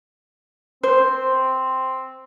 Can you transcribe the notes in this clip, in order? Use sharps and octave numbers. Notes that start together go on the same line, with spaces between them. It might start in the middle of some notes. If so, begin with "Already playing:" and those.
C4 C5